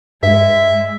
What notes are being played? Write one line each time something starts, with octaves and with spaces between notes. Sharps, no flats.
G2 G#3 E5